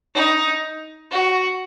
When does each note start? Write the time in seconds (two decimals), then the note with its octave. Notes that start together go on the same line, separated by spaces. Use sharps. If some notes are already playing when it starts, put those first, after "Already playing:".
0.15 D#4
1.11 F#4